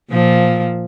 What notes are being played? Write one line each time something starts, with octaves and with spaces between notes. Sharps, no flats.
A#2 F3